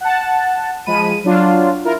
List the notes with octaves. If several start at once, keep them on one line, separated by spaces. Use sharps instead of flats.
F#5 A5
F3 G#3 B5 D#7
F#3 D4 F4
E4 F4 A#4